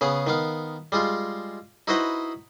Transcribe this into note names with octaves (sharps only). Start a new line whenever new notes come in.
C#3 B3 G#4
D#3 B3 F5
G3 G#3 F4
D#4 E4 F#4 B4 C5 D#5